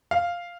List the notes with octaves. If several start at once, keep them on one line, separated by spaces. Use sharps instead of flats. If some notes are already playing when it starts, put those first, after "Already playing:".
F5